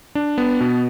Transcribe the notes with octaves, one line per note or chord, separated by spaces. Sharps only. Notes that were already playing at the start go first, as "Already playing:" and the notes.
D4
B3
B2